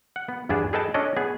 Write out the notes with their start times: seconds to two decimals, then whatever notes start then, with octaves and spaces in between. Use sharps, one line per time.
0.16 F#5
0.29 B3
0.49 E2 G2 B3 D4 G#4 A5
0.73 G#4 A4 B4 D#5 G5 A5
0.94 C#4 D4 A4 C#5 D#5
1.17 B3 G#4